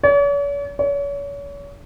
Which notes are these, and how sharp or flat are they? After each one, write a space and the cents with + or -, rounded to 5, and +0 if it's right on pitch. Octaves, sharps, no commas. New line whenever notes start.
C#5 +45
C#5 +35